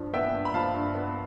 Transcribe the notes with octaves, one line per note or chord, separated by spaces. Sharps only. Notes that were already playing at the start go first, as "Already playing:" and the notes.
Already playing: G2 F3
B3 E5 G5
G2
B5
F3 F5 A5
G2
B3